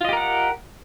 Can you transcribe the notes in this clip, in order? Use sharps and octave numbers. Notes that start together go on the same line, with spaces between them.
F4 G4 A#4 D#5 F#5